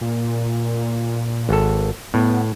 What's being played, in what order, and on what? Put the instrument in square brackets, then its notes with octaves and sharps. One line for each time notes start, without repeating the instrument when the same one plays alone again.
[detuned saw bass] A#2
[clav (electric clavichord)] G#1 A4
[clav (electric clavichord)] A2 [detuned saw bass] B3